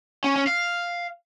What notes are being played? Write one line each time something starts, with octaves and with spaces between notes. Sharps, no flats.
C#4
C#4
F5